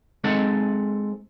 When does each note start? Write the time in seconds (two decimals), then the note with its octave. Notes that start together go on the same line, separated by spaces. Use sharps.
0.24 G#3 C4 D#4 A4 F#5